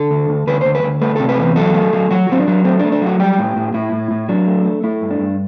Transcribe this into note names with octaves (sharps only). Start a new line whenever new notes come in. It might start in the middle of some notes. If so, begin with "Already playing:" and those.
Already playing: D3 A4
D2
D2
D2 B4
D2 C5
B4
D2
A3 B4
C3 A4
B4
E2
F#3 A4
A3
F#3
F#3 F#4
F#3 C4
D4
F#3
A3 C4
D4
A3
D4
F#3 F#4
G3 G4
A2
A2
A2 E4
A2
A2
F#3 D4
A3
A3
A3 E4
G2
D4
G2